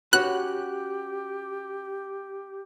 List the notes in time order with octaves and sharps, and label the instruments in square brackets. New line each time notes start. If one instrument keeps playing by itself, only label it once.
[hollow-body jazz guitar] C#4 F#4 B4 [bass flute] G4 [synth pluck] F#6